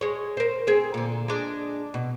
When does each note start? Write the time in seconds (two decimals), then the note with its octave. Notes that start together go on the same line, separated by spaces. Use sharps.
0.01 G#3 C#5
0.37 A#4 C5
0.67 C4 G#4
0.94 A#2 D3
1.28 G#3 D4
1.94 B2